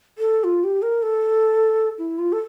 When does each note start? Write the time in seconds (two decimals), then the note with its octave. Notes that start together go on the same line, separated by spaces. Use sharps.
0.18 A4
0.44 F4
0.64 G4
0.82 A#4
1.02 A4
1.98 E4
2.18 F4
2.32 A4